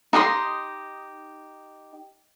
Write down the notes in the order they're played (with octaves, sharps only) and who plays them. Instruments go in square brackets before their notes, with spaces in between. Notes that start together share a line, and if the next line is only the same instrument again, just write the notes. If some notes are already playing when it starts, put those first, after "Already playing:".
[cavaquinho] D#4 G4 D#5 C6